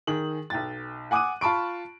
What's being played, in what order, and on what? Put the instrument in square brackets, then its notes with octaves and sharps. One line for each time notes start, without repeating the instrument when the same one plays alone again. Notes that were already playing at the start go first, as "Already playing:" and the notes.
[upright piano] D#3 G#4 F#7
B1 G5 A6
F#5 G#5 D6 D#6 F#6 D#7
F4 A5 B5 C#6 D7